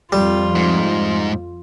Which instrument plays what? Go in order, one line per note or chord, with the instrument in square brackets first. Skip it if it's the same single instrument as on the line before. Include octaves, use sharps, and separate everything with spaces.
[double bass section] F2 [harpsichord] G3 [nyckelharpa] F4
[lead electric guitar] G#2